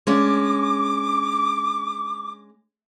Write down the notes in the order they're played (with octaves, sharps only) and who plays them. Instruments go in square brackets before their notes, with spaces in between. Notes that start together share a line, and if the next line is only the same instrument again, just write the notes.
[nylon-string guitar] G#3 C#4 D4 [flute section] D6